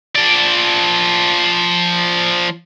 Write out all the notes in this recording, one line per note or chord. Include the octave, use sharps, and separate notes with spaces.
F3 D5